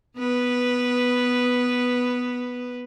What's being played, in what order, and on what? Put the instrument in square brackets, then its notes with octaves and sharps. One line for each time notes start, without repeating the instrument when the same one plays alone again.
[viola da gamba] B3 B4